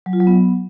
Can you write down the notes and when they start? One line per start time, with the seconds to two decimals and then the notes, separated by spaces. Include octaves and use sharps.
0.06 F#3
0.13 F4
0.20 F#3
0.27 B3